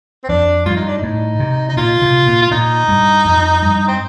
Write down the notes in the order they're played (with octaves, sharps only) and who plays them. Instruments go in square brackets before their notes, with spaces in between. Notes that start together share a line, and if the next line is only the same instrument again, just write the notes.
[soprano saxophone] C4
[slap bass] F2 [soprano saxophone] D4
[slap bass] G2 [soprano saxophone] F4
[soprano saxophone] D#4
D4
[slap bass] A2 [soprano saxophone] D#4
[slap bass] C3
[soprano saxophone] D#4
[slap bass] A#2 [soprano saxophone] F4
[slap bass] C3
A#2
[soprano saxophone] F4
[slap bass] A#2 [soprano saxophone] D#4
[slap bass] G2
F2
G2
[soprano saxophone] C4